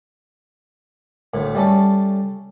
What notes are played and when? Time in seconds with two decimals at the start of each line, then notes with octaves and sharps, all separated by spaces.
1.34 D2 A2
1.55 G3 A3 C#4 A4